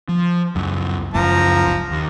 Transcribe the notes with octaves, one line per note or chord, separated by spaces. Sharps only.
F3
C#2 F#2
F#1 C#2 F#2 F3 A#5
D#2